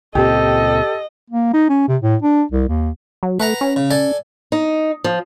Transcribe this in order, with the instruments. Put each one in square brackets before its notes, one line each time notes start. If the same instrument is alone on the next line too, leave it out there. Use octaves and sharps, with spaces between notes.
[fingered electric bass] C#2 A#2 C4 [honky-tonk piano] G4 [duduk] A4 [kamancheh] D#5
[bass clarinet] A#3
D#4
C#4
C3
A2
D4
C2
D#2
[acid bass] F#3
[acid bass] A3 [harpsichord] B4 F#5 A#5
[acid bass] C#4
[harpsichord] C#3
A4 D5 G#5
[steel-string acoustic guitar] D#4
F3